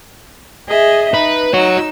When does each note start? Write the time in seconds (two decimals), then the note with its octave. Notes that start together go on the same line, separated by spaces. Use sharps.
0.70 G#4 D#5 E5
1.14 D#4 B4
1.54 D#4 F#4 C#5 E6